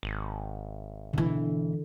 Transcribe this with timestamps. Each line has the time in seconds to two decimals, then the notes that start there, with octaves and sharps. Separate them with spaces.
0.03 G#1
1.13 B2 D3 E3